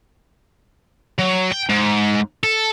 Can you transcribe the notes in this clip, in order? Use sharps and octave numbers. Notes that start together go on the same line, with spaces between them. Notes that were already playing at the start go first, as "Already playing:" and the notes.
F#3
G5
G#2
A4